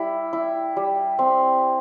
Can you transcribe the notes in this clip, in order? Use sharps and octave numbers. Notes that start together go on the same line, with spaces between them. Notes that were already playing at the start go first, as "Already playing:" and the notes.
Already playing: G3 E4
E4
G3
C4